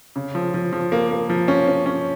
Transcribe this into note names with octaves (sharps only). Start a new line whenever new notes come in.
C#3
F3
F3
F3
A#3
A#3
F3
C#4
C#4
C#4